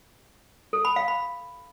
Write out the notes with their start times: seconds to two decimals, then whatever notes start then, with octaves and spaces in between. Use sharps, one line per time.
0.73 A4
0.85 B5
0.96 F5
1.08 B5